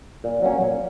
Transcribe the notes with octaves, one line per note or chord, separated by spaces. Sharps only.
A#2
F#3 A#3 C#4
A#2